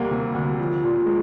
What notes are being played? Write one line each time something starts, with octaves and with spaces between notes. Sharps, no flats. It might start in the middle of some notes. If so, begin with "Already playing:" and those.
Already playing: D2 C3 G3 A#3
C3
D2
F3
A#2
G#3